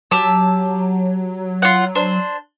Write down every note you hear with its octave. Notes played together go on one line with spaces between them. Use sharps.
F#3 G4 A5 E6
F4 F#5
D4 C5